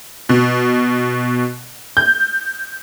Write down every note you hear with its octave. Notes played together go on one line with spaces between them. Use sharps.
B2
G6